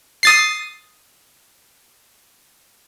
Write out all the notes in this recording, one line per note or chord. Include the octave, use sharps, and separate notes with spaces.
D#6 A6 C7